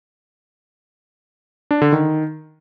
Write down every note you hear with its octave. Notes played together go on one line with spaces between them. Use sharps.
D4
D3
D#3